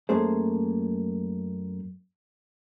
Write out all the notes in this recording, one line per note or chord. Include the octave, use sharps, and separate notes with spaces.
F#2 A3 A#3 G#4 C5